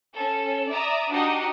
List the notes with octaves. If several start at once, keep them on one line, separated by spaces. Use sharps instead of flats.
C#4 A4
D5 E5 A#5 D#6
D4 D#4 F#4 G4 D#5